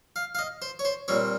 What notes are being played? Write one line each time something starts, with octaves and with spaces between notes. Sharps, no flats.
F5
F5
D#5
C5
C#5
C5
A#2 G3 C4 C#5